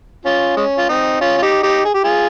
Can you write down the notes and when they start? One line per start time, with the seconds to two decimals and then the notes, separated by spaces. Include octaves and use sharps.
0.25 C#4 F4
0.57 G#3 C#4
0.78 F4
0.89 C4 D#4
1.21 C#4 F4
1.38 F4
1.42 D#4 G4
1.63 D#4 G4
1.85 G#4
1.94 G4
2.04 F4 G#4